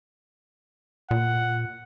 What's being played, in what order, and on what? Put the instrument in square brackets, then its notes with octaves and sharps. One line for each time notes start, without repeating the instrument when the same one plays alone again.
[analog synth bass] A#2 [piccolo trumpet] F#5